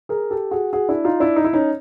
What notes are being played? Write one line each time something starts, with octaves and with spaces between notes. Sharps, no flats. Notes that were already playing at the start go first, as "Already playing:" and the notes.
G#4 A#4
G4 A4
F#4 G#4
F#4 G#4
D4 E4
D#4 F4
D4 E4
D#4
E4
C#4 D#4